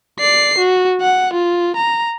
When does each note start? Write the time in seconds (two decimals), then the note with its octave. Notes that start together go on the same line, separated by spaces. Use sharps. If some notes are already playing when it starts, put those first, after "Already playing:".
0.19 D5 C7
0.58 F#4
1.01 F#5
1.33 F4
1.76 A#5